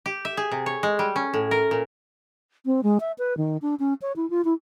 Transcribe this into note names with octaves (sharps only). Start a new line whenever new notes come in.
G4
E5
G#4
C3
C#5
G#3
G3
C#4
A2
A#4
A#2
C4
G#3
E5
B4
D#3
D4
C#4
C#5
E4
F4
E4